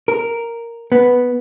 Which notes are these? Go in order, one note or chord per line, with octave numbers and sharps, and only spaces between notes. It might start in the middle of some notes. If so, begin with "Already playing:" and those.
A#4
B3